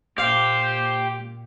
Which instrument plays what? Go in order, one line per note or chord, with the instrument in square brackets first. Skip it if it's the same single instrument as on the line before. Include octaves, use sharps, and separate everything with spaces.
[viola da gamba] A#2 [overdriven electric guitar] G4 [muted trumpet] C5 [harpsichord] F5